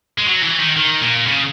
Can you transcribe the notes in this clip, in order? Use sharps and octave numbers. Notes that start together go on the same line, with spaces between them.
G#3
F#3
E3
D#3
D#3
A#2
C#3